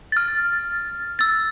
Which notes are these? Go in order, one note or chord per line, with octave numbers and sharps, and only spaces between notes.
F6 A6
E6 A6